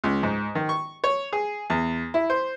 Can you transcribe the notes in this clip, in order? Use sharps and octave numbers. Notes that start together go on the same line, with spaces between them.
C#2
G#2
D#3
C#6
C#5
G#4
E2
E4
C5